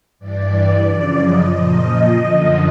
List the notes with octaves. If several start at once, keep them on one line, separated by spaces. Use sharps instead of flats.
G2 E3 D5
F#2 C#3 F3 D5
D#5
A#2 F3 D#5
F#2 D3 F3